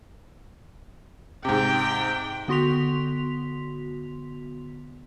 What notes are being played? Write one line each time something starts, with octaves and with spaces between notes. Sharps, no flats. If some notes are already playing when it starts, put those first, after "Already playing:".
G#2 C3 G5
D3 B3 F#4 C6 B6 F7